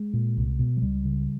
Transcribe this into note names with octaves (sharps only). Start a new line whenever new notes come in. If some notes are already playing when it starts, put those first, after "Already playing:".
Already playing: G#3
A#2
C2
B2
F#3
C#2 G3
C#3